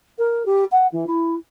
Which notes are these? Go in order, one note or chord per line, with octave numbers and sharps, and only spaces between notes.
A#4
G4
F#5
E3
E4